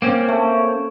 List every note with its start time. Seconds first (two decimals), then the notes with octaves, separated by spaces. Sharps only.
0.02 A#3 C4 C#4
0.28 A3